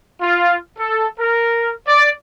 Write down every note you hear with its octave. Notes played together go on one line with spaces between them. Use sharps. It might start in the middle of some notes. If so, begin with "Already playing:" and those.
F4
A4
A#4
D5